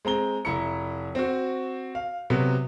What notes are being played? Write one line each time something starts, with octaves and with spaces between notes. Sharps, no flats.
G#3 C4 A#5 G7
F1 E4 A#5 C#7
C4 F#4
F5
C3 F#3 B3